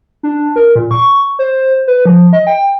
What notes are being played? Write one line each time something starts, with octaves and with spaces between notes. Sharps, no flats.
D4
A#4
A#2
C#6
C5
B4
F3
D#5
G5